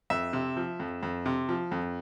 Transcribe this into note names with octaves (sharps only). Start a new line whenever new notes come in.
F2 E5
C3
F3
F2
F2
C3
F3
F2